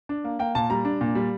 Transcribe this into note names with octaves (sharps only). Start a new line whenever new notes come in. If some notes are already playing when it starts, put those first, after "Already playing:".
D4
A#3
A#3 G5
A#2 A5
G3 A#5
D4
A#2
G3